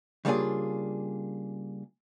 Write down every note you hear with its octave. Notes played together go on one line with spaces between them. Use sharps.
C#3 G3 A#3 D4 F4 G#4